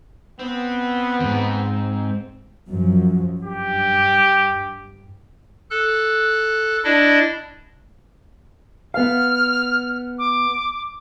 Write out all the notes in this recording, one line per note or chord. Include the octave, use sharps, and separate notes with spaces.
B3 C4
E2 G#2
F#2 F3 F#3
G2 G4
A4 F#6
D4 E4 D5 D#5
B3 F5 F6
D6